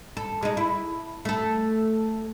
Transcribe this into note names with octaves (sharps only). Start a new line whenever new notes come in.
A4
G#3 D#4
E4
A3 A4